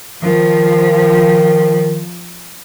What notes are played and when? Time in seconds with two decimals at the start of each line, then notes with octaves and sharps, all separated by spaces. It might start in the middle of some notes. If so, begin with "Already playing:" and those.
0.22 D#3 F3